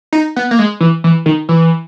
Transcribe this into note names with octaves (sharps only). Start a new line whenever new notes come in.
D#4
B3
A#3
G#3
E3
E3
D#3
E3